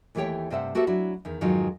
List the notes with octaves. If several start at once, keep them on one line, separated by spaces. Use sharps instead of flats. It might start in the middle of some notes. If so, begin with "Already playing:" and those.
D#2 E3 A3 G4 C#5 G5
G2 C3 G3 C5 E5 F#5
A#3 F#4 G4 A4 B4 E5
F#3 D4 E4 F#4
E2 D#3
F2 G#2 D#3 F#3 D#4 F4